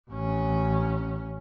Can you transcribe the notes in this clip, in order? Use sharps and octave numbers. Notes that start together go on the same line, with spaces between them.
A1 C#4